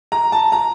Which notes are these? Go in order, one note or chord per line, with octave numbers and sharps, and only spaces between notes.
A#5
A5
A#5